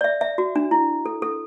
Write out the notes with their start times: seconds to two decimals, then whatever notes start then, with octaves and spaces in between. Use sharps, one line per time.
0.01 D5
0.04 E5
0.21 E5
0.38 F#4
0.56 D4
0.71 E4
1.06 A4
1.22 A4